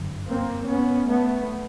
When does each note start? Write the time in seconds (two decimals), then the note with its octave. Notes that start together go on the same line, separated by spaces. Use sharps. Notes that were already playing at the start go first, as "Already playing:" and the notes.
Already playing: G1 F#2 D3
0.28 A#3 C4
0.69 B3 C#4
1.09 A3 B3